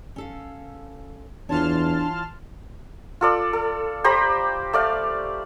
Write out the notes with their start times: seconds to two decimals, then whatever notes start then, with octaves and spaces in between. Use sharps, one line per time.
0.16 C#4 A4 F5
1.49 E2 E3 D4 F4 C#5 A5 C6 F6
3.21 F4 A4 D5
3.53 A4
4.04 G4 C5 A#5 B5
4.73 A3 D5 F5